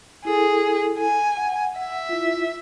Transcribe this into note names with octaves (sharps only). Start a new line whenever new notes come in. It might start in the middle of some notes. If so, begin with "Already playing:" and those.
E4 G#4 A4
G#5
F#5
E5
E4 F4